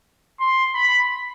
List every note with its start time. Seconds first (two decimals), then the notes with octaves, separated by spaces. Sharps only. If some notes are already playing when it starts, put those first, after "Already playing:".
0.40 C6
0.75 B5